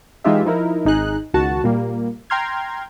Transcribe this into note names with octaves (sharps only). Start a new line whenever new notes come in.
E3 G#3 D#4 F4 G4 E5
F3 D#4 E4 A#4
G#1 D#4 G#4 F#6
C#2 D#3 F#4 A5
A#2 G3 A#3
G5 A#5 C6 F6 G#6